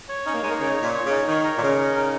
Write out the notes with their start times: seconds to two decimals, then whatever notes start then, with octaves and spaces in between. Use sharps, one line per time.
0.09 C#5
0.26 C#4 D#4
0.34 A#3
0.42 G#3 D#4
0.50 A#3
0.59 C#3 C#5
0.77 C#5
0.82 A#2
0.94 C#5
1.05 C#3
1.11 D#4
1.27 D#3 C#5
1.44 A#4
1.57 A#2
1.62 C#3 D#4
1.78 A#4
1.96 D#4